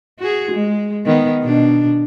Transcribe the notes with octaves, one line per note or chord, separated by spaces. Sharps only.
F#4 G#4
G#3
D#3 B3
B2 D4